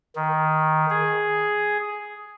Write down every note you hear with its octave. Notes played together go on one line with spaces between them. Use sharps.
D#3
G#4